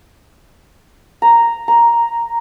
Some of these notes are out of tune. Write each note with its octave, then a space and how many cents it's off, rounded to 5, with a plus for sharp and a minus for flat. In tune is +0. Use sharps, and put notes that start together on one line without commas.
A#5 -5
A#5 +5